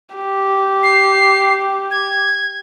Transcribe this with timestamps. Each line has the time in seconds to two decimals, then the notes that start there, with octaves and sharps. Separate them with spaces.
0.15 G4
0.83 C7
1.91 G#6